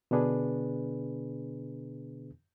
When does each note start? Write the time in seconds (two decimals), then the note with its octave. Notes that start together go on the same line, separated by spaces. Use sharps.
0.11 B2 D3 B3 D4 G#4 B4